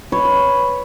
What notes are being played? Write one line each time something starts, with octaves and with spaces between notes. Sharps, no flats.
B4 C#5